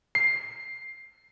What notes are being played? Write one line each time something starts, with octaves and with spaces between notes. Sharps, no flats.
C7